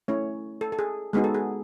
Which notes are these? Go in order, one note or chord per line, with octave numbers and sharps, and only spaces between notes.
A3 C#4 E4 C#5
A4
A4
G#4
G#3 B3 D#4 F#4 G#4
A4
G#4